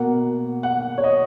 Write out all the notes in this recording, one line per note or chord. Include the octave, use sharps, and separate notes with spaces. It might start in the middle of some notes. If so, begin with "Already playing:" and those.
Already playing: B2 A#3 F#5
F#5
C#5
D#5